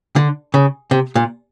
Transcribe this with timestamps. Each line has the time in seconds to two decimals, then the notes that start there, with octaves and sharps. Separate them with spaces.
0.16 D3
0.54 C#3
0.91 C3
1.15 A#2